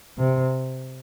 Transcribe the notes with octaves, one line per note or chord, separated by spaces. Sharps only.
C3